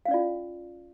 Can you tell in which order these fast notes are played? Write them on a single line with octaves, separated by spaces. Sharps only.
F5 C#4 D5 F4